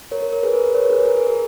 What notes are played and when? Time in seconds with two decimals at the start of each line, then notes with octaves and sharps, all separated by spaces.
0.11 A#4 C#5
0.22 A#4
0.33 A#4
0.43 G#4 B4
0.54 A#4
0.70 B4
0.74 A#4 C#5
0.90 G#4 B4
1.01 G#4
1.05 A#4
1.17 G#4
1.27 A#4